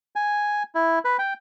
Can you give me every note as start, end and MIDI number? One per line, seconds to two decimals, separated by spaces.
0.16 0.63 80
0.75 0.99 64
1.05 1.17 71
1.19 1.33 79